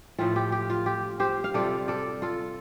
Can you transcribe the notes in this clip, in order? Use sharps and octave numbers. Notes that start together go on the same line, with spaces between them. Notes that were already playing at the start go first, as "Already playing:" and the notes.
A2 F3 A3 C4 F4
G4
G4
F4
G4
G4 C5
F5
C3 G3 F4 A4 D5
A4 D5
F4 A4